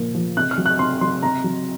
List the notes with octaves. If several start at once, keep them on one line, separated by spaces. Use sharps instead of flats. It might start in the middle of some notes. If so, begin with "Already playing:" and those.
Already playing: A#2 F3
F3
C3 F#6
F6
F#3
F#6
C3 C6
F#3 C6
C3 A#5
F#3